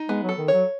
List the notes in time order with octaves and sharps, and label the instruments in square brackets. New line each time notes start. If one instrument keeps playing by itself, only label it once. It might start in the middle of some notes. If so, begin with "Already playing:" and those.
Already playing: [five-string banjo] D#4
[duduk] G#3 [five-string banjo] B3
[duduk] F#3
[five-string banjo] A4
[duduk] D#3
[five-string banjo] C#5
[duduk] F#3